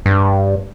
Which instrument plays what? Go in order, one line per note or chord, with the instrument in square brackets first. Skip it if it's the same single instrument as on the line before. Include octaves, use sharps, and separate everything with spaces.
[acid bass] G2